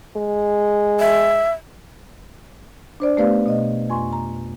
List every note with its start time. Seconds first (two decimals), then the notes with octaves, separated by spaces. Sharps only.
0.17 G#3
1.00 E5
3.00 D4 C5 D5
3.17 A3 B3 G4 B4 D5 F5
3.46 B2 D#5
3.89 F2 G#5 C6 C#6
4.13 A#5